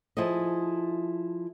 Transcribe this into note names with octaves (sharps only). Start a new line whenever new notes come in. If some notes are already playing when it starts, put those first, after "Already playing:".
F3 E4 G#4 A4 D#5